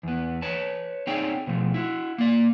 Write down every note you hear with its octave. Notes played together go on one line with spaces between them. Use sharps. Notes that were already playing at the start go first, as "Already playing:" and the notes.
E2 B3
B4 C#5 A5
C4 D#4 G#4 C#5 D5 G5
B2 F3 A3
E4 F#4
A#3 D5